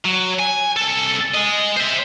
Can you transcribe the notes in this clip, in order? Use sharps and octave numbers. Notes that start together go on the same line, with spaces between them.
F#3
G#5
C2 A4
G#3 D#5
C5 E5